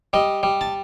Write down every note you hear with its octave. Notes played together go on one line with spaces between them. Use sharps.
G3 D#5
G3
A5